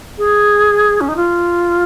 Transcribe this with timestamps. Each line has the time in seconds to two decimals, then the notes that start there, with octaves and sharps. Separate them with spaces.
0.18 G#4
1.01 C#4
1.08 D#4
1.16 F4